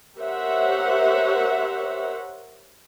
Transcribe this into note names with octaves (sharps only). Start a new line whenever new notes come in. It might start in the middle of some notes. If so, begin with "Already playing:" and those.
G4 A#4 C5 C#5 E5 F#5